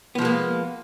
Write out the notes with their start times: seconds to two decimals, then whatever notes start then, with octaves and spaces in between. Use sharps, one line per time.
0.15 B3
0.18 F3
0.22 G#3
0.25 A#3